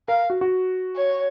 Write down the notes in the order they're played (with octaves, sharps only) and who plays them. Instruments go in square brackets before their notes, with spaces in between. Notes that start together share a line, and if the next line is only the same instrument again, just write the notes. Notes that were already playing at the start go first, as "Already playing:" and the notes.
[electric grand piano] A#4 [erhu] F5
[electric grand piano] F#4
F#4
[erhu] C#5